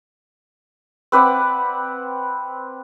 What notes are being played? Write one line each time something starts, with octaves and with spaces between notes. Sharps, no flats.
C4 B4 D5 F#5